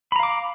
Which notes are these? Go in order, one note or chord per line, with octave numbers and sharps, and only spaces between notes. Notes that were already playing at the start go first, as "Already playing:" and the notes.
F5 A#5 B5 D6